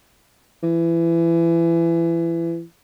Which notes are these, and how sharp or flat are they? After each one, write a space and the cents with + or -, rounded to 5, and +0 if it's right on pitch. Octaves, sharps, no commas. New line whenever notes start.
E3 +25